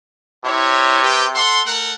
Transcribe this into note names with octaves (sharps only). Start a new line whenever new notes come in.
C3 E4 C#5
G4 B4 G5
A4 F#5 C6
A3 A#4 F#5